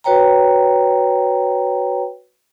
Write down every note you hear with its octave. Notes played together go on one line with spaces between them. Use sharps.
F#4 B4 C#5 G5 A#5